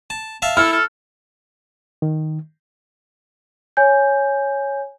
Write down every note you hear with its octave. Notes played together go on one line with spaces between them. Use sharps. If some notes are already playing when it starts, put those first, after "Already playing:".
A5
E5 F5 A5
E4 A4 F6
A4
D#3
C#5 G#5 G6